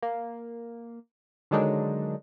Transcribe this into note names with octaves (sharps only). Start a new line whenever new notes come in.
A#3
D3 D#3 F#3 G#3 D4 D#4